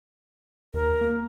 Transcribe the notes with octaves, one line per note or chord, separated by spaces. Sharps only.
D#2 A#4
A#3